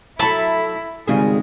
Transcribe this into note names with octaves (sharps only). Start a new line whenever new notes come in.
F#3 E4 A4 E5 A5 B5
G#1 C#3 G3 G#3 G#4